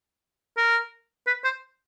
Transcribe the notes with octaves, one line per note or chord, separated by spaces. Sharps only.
A#4
B4
C5